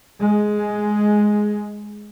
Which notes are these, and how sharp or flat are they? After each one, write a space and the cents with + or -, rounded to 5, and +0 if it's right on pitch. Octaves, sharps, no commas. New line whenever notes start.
G#3 +5